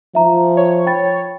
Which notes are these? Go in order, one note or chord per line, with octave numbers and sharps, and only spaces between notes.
F3 E5 A#5
C#5
G5 B5 A6